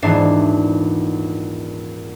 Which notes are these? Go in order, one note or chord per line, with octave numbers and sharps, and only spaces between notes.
D#1 G#2 E3 D4 C7